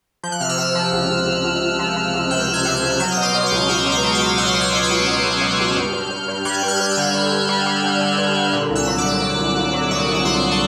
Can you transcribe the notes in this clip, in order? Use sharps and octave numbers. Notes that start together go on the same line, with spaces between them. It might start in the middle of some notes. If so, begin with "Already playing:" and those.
F3 G6
F#6
C3 F6
E6 F#6
C3
F3
C#2
C#2
C#2
C#2
C#2
F3
F3
C#2
C3 F6 G6
C#2
F#6 G#6
C3
F#6 G#6
C#2
F#3 F6 G6
B2 D#6
C6 D6
B2
C#6 D#6
C#2
C#2 D6 E6
B2
D6 E6
F#3
D#6 F6
F#3
B2 E6 F#6
B2
F#6 G#6
B2
F6 G6
C#2
B2
C#2
B2
C#2
G2
G2
G2
G2
G3 F#6 G#6
G2
F6 G6
G2
F6
E6 F#6
D3
G2
G2
G3
G3
D3
D3
G2
D3
A#2
C2
E6 F#6
F#3
D6 E6
A#2
A#2
C2
C2
F#3
A#2 C#6 D#6
C2
C#6
C2 C6 D6
A5